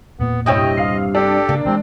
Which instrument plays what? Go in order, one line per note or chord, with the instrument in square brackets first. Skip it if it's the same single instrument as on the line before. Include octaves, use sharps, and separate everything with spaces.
[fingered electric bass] E1 A#2 A#3 [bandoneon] B3
[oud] G2 C3 E4 [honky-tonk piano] C#5 G5 D#6 [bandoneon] D#5
[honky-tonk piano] F5 F6 C7
[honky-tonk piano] D4 [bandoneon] G4 A4
[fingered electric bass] C#3 [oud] A#3
[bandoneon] C3 C4 [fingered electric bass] E3 F#3 G#3